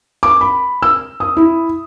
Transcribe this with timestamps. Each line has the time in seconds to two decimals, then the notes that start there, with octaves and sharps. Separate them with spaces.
0.23 D6
0.41 B5
0.82 E6
1.20 D#6
1.37 E4